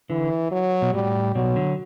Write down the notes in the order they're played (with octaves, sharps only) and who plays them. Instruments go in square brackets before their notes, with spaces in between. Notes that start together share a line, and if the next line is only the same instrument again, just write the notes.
[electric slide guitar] D3 [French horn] E3
[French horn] F#3
[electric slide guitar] B2
[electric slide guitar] A2 [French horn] G3
[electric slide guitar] B2 [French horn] F#3
[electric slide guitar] D3